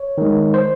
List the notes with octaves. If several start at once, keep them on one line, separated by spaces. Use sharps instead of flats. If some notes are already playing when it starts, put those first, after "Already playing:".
Already playing: C#5
D#3 G#3
C5